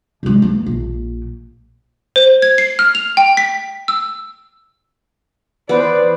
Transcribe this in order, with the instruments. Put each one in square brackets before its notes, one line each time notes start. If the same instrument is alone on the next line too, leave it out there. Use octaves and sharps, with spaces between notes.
[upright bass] C3 G#3
E3 A#3
A#1
[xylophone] C5
G#6
C7
F6
F7
G5
B6
E6
[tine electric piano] E3 B4 [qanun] B3 [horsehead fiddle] C5 D5